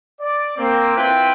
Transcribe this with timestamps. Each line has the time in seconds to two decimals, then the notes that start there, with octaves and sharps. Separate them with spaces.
0.21 D5
0.57 A#3 C4
0.96 C4 E4 F4 B4 G5